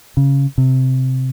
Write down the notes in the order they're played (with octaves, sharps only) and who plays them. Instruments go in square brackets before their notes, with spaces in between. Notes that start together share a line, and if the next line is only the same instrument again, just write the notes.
[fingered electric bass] C#3
C3